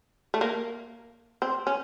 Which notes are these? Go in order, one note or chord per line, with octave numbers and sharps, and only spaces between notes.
A3
A#3
C4
C#4